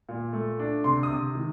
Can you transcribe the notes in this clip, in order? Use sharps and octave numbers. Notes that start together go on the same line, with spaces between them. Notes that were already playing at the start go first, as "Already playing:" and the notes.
A#2
A3
D4
C3 C6
D#6
C3
D#3